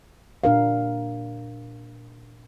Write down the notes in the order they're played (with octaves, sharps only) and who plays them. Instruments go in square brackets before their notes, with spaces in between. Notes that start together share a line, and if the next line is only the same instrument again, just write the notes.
[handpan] A#2 D4 A#4 F5